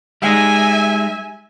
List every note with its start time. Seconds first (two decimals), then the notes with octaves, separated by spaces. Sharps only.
0.22 G3 G#3 D#4 E5 G#5